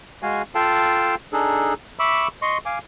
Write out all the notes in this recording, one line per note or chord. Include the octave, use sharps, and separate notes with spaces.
G#3 F#4 F5 G#5
F4 A4 F5 G5 A5
D4 D#4 G#4 A4
E5 B5 C#6 D6 E6
D#5 C6 C#6
F5 G#5 D6